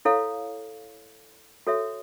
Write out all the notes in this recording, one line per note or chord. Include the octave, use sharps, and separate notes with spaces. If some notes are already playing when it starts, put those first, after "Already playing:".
E4 A4 C#5 F5
F#4 A4 C#5 E5